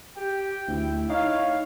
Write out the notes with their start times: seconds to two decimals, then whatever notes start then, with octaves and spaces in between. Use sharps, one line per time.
0.17 G4 G5
0.68 D2 E4
1.10 D#4 C#5 F5